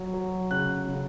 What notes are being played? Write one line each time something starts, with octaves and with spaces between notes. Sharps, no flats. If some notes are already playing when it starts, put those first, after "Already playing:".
Already playing: F#3
F#3
C#3 F#6
C#3